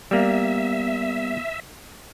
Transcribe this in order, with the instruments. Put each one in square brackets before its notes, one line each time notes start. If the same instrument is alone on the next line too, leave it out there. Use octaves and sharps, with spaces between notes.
[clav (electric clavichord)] G3 A#3 [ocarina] B3 [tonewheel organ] E5